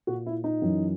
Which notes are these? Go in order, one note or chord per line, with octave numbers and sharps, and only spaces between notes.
A#2 F#4
E4
D#4
F#2 E3